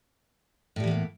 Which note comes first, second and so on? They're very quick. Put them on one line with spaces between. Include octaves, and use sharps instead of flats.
A2 G3 E3 B3 A#3